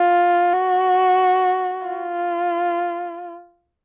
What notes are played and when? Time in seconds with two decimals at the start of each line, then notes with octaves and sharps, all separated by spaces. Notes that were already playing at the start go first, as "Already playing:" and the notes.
Already playing: F4
0.54 F#4
1.87 F4